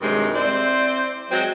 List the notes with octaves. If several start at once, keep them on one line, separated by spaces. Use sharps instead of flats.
G2 C3 D#3 F#3 G#3
C4 E4 C5 D5
F#3 G#3 C4 F#4